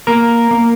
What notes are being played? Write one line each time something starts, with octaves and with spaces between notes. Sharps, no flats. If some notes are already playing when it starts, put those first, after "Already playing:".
A#3 A#4
A#3